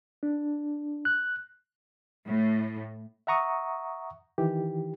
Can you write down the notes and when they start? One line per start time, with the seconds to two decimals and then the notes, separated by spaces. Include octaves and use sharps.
0.23 D4
1.05 F#6
2.26 A2
3.27 E5 F#5 A#5 C#6 D#6
4.38 D#3 E3 G4